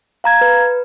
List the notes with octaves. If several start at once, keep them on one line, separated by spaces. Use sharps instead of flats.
F5 A#5 G#6
B4